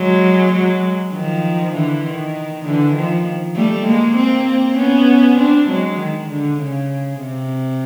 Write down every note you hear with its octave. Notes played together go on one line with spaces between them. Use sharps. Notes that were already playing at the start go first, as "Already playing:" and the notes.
Already playing: F#3 G#3
F#3 G#3
D#3 F3
D3 E3
D#3
D3 E3
D#3 F3
G3 A3
G#3 A#3
A#3 C4
B3 C#4
C4 D4
F#3 G#3
D#3
D3
C#3
C3